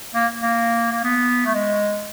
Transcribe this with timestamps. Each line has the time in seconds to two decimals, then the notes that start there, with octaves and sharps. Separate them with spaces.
0.14 A#3
0.40 A#3
0.92 A#3
1.03 B3
1.46 A3
1.54 G#3